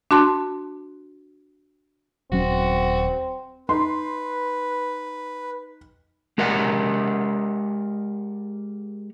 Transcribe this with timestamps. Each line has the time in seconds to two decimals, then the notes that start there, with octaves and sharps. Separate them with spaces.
0.11 D4 F#4 A5 C6
2.32 D#1 F#3 C4 C#4 F#4
3.69 D#4 B4 C6
6.38 G#3 G4 A#4 D#5 F#5